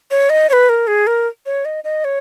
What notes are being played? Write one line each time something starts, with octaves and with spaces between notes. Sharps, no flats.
C#5
D#5
C#5
B4
A#4
G#4
A#4
C#5
D#5
D#5
C#5